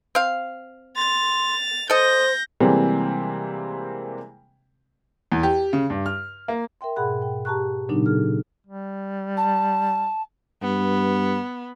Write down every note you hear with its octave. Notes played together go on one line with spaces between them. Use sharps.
C4 F5
C6 A6 F7
A4 C5 D#5 G6 A#6
C3 E3 G3 G#3 A#3 C4
E2
G4
C#3
G2
F6
A#3
A#4 E5 G5 C6
G#2 B2 G#4 F#5 B5 F#6
G5
G4 A5 A#5 C#6 F#6
A#2 C#3 F#3 B3 D4 D#4
G#4 A4 F6
G3
A5
G2 B3